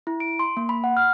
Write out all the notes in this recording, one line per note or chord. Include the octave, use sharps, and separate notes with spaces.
E4
D7
C6
A#3
B5
F#5
F6